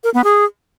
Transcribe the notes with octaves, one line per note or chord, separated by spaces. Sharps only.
A#4
B3
G#4